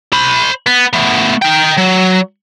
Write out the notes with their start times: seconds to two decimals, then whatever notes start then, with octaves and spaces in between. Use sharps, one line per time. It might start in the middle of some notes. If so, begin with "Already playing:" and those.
0.13 C5 B5
0.66 B3
0.93 A3 B3
1.42 D#4 G5
1.77 F#3